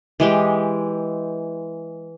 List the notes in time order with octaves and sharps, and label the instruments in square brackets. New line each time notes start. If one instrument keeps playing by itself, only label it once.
[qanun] E3 G#3 G4